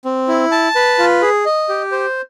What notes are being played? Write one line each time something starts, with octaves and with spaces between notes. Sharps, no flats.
C4
E4
A5
B4
F4
G#4
D#5
G4
C5